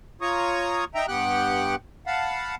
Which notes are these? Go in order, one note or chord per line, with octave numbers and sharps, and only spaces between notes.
F4 C#5 A#5 C#6 D#6
D#4 E5 G5 A#5
G2 B3 G4 F#5 G5 F#6
F5 F#5 A5 B5